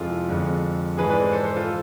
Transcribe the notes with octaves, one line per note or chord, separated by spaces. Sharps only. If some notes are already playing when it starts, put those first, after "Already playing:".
Already playing: F2 C3 G#3 E4 F4 G#4 A4
F2 D3 G#3
G#2 E3 G#3 G#4 B4
B4 D5
A4 C5
A4 C5
A4 C5
F4 A4